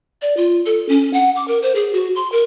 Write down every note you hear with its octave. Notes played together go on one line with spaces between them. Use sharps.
D5
F4
A4
C#4
F#5
D6
A#4
C5
G#4
F#4
C6
A#4